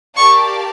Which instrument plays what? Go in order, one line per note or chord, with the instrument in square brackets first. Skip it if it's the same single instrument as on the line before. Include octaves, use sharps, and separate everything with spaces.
[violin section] G4 A#4 D5 F5 A5 [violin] C#6